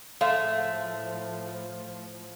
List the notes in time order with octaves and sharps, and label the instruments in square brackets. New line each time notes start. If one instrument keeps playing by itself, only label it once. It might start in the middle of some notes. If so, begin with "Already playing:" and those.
[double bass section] A2 F3 [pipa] G#3 F5 G#5 [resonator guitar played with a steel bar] A3